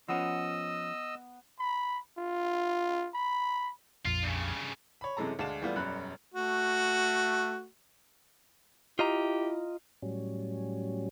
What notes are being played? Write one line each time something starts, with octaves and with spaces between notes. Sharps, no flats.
F3 B3 C#4 D#5 E6
B5
F4
B5
A#1 F2 F4
G2 C#3
C#5 B5
F#2 C3 E3 G#3 A4 A#5
D2 G#3 D5 F5 A5 E7
E3 G3 A3 B3 F4
E1 F#2 G3 B5 F#6
A3 F#4
E4 F4 G4 D#5 A#5
A2 F#3 G3 C#4